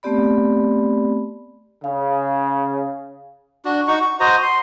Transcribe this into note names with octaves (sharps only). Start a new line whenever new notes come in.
A3 B3 C4 G4 D5 B5
C#3 F5
D4 F#4
D#4 F#4 C#6
C#6
F#4 C5 D#5 A#5
C6